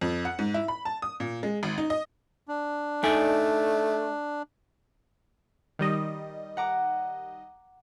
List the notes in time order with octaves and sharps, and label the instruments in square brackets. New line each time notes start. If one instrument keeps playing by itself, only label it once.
[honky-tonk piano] F2
F#5
G#2
E4
B5
A5
D#6
A#2
G#3
G#1
D#4
D#5
[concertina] D4
[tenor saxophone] A3 [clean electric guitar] D#4 D5 G#5
[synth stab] D#3 G3 D#5
[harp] F#5 A#5 D6